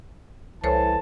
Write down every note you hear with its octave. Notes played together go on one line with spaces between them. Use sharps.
C2 E3 A4 C5 C#5 A5